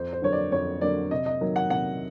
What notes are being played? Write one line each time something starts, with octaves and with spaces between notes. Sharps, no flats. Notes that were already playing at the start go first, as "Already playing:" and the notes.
Already playing: F2 C5
C5
D3 F#3 A#3 C#5
D5
F2 C#5
D3 F#3 A#3 D5
C3 D#5
D#5
D#3 F#3 A#3
F#5
C3 F#5